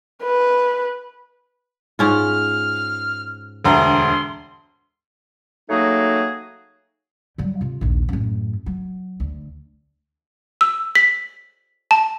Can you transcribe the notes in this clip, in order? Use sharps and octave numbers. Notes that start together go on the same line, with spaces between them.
B4
G#2 C#4 F4 F6
E1 D2 A#5 C6
F#3 A3 A#3 D#4 F#4 G#4
F#3 G3
C3 F4
A#1 D#2
F#2 A2
F#3
D2
E6
B6
A5